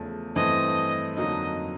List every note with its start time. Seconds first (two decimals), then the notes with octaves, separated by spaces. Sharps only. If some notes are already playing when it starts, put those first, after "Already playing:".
Already playing: E2 C#3 F3 A3
0.36 G2 E3 A3 C4 D#5
1.17 F2 D3 F#3 A#3 D#4 D#5